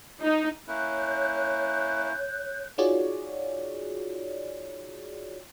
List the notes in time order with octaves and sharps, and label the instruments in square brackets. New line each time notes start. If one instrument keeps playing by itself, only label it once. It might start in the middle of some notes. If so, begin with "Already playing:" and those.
[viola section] D#4
[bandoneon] A#3 C#4 E4 [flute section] C#5 F#6 G6
[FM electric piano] D#4 F4 F#4 G#4 C#5 D5